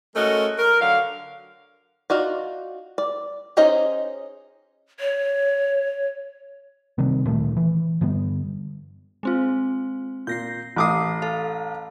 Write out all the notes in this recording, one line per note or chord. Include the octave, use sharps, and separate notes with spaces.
G#3 A3 C#4 F#4 A#4 D#5
A#4
D3 F#3 F5
D#4 F4 F#4 D5
D5
C#4 D#4 G#4 C5 D#5
C#5
C3 D#3 G3 C4
D1 A#2 D#3 A3
E3
G2 D3 G3 B3
G#3 C4 F4
A#2 G6 A#6 C7
A1 E3 D6 D#6 C7
A4 F5